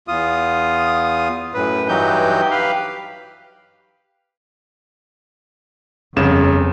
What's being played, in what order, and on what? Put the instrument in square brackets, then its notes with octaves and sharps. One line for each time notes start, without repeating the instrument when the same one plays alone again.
[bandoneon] E2 F4 D#6
F#2 A2 B4
G2 E3 F#3 D#4 G4 G6
G4 B4 F5
[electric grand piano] G1 C#3 E7 [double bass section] F2